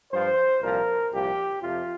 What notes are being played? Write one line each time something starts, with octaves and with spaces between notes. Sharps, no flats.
G2 F3 C5
C2 A#2 F3 A#4
C2 A#2 F3 G4
F2 C3 F3 F4